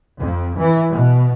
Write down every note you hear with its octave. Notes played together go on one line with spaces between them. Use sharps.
F2
E3
B2